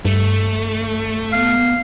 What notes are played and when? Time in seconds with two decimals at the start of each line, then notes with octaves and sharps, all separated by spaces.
0.05 G2 A3
1.33 B3 F5